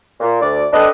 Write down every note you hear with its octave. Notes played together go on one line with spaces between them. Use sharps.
A#2
D2 D5
D4 G4 A4 B4 D#5